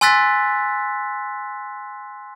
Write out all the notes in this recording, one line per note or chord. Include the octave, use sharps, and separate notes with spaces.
G#5 C6 E6 F#6 A6 B6